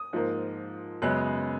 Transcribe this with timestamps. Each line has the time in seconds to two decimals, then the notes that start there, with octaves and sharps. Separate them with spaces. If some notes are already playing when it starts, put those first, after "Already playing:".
Already playing: D#6
0.13 G#2 F3 A#3
1.02 F#2 C#3 G#3 B3 F#6